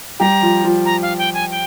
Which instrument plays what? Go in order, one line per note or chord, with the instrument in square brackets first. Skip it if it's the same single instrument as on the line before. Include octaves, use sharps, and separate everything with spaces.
[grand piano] G3 G4 [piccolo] A#5
[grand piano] F3 F4
F3 F4
[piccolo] A#5
F5
G5
G#5
G5